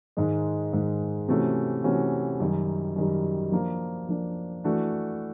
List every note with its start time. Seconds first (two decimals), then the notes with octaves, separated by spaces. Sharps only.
0.17 G#2 D#3 G#3
0.73 G#2 D#3 G#3
1.28 C3 E3 A3 C#4 F#4
1.84 C3 E3 A3 C#4 F#4
2.40 F#2 D#3 G3
2.96 F#2 D#3 G3
3.52 F3 A#3 D4
4.09 F3 A#3 D4
4.64 E3 A3 D4 F#4